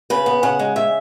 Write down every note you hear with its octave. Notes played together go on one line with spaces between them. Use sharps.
C#3 B4
B3
C#3 F#5
G#3
C#3 E5